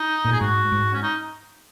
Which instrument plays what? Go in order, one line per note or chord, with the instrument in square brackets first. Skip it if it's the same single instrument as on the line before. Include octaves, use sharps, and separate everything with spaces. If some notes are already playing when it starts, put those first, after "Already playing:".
Already playing: [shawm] D#4
[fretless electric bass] A#2
[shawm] G#4
[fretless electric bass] G#2 [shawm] F#4
[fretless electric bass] G#2
[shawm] C#4
D#4